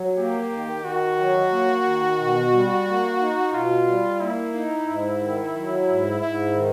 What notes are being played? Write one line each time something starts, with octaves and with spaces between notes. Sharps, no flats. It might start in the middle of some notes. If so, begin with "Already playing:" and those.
Already playing: F#3
A#3 G4
D#3
D#3 F#4
F#3
A#3
D#3
B2
G3
A#3
D#4
B2 F4
G3
A#3 E4
D#4
G#2
D#3
F#3
G#2
G#2 E4
D#3